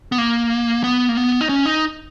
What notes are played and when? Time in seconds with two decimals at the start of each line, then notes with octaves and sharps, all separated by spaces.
0.12 B3
0.18 A#3
0.84 B3
1.09 A#3
1.17 B3
1.41 D#4
1.49 C#4
1.66 D#4